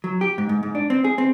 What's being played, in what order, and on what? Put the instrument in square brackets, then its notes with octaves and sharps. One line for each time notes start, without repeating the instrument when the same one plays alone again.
[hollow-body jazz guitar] F#3
G4
G#2
G#2
G#2
D4
C4
G#4
C4